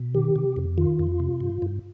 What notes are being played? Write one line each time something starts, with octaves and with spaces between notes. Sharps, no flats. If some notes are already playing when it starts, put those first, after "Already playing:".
Already playing: B2
D#3 G4
C3
F2
D#3 F4
F2
C3
G2
G2